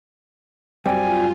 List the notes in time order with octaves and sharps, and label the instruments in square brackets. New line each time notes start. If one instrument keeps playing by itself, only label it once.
[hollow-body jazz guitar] F#2 G3 [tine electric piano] C4 D5 G5 [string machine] F4 [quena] G#5